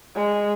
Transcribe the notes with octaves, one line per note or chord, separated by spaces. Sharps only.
G#3